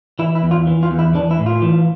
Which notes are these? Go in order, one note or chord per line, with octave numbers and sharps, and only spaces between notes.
E3 E4
E4
E2
F4
E3
F4
E2
E4
E3 D4
E4
A2
F4
E3